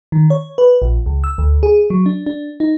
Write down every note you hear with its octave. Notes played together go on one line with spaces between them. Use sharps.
D#3
C#5
B4
A#1
C#2
E6
D2
G#4
F#3
D4
D4
D#4